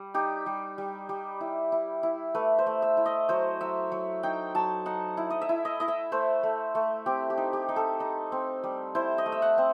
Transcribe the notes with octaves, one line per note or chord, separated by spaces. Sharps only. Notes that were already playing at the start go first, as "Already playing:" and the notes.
Already playing: G3
D#4 G4
G3
G3
G3
E4
E4
E4
A3 B4
C5
A3
E5
E4
D#5
F#3 C5
F#3 E5
F#3
D#4 G5
F#3 A5
D#4 F#5
E4
D#5
E5
E4
D#5
E4 D#5
E5
A3 C5
A3
A3
C4 G4
G4
D#4
G4
D#4
A4
D#4
C4
G3
E4 C5
D#5
A3
E5
F#5
C4